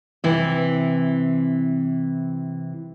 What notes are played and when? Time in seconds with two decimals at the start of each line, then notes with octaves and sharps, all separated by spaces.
0.24 C3 E3